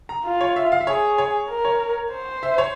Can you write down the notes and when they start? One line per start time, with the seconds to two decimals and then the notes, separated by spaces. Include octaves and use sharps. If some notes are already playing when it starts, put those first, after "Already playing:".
0.09 A#5
0.24 F4
0.41 C#5
0.56 E5
0.72 F5
0.81 E5
0.87 G#4 C#5
1.18 C#5
1.49 A#4
1.65 C#5
2.12 C5
2.43 E5
2.58 C#5